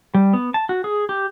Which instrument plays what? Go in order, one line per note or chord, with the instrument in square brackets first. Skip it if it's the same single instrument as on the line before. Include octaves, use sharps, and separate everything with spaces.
[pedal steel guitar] G3
B3
A5
F#4
G#4
G4